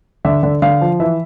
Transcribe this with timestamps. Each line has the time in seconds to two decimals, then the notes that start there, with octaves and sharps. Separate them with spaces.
0.25 D3 E5
0.43 D3
0.62 D3 F5
0.81 F3
1.00 E3 E5